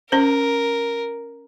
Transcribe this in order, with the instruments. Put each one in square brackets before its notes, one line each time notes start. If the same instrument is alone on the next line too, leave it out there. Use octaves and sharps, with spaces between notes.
[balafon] C#4 C5 [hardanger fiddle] A#4